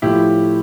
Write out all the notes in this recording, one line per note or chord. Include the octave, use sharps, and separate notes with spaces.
A2 F3 E4 G4